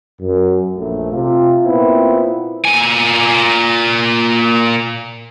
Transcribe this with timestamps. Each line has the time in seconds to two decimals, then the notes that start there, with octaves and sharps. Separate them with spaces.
0.21 F#2
0.77 A#1 A3
1.12 C3 F4
1.65 A#2 B3 C4 E4
2.65 A#2 G#5